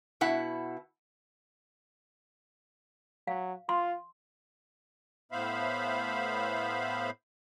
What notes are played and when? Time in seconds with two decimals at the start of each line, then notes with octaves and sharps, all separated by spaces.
0.21 B2 E4 F#5
3.27 F#3 F5
3.69 F4 C6
5.32 A2 B3 C5 E5 F5 B5